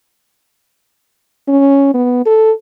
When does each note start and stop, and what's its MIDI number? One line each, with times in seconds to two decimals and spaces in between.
1.48 1.89 61
1.94 2.24 59
2.26 2.52 69